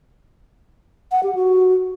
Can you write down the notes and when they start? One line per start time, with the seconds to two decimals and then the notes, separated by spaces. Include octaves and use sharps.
1.12 F#5
1.23 G4
1.35 F#4